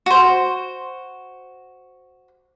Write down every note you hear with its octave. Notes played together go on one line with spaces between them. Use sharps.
F#4 C5